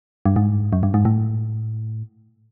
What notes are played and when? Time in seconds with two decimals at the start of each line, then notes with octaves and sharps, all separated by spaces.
0.26 G2
0.36 G#2
0.73 F#2
0.83 G2
0.94 G#2
1.05 A2